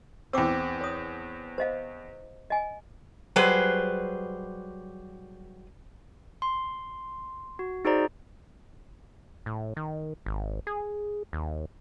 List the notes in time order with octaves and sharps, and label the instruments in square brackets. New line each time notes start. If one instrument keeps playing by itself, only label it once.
[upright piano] E2 C4 [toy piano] G5 D6 E6
[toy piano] C#5 D#6
C5 D#5 F5
D#5 G#5
[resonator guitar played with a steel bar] F#3 G3 G#4 B4 C5
[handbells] C6
F#4
D#4 F#4 G#4 C5 D5 A#5
[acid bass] A2
D#3
G#1
G#4
D#2